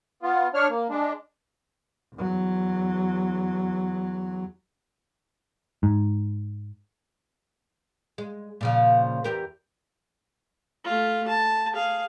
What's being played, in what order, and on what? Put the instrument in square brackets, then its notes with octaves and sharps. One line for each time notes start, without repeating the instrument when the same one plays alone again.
[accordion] B3 F4
D4 C#5 F6
A#3
G#3 D4
[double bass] E2 F#3
[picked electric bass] G#2
[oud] G#3
A#2 C#3 F3
E2 G4 A#4
[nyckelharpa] A3 F4
A5
G#4 F5